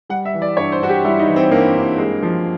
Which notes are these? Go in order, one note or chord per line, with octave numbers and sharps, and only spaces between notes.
G3 F#5
E5
E3
D5
G2 C#5
C5
G2 F#4
G4
G3 E4
D#4
E3
C4
G2 A#3
G2
G#3
F3